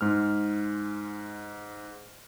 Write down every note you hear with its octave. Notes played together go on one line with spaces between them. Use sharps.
G#2 G#3 F6